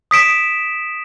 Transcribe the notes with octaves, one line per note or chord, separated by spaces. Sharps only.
D#6 B6 D7 E7